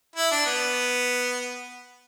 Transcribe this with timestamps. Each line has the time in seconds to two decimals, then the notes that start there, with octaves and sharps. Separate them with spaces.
0.16 E4
0.31 D4
0.46 B3